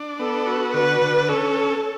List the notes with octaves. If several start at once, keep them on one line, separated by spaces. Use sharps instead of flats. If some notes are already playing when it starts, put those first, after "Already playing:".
Already playing: D4
B3 A4
F#4
D3 B4
D3
C#4 A4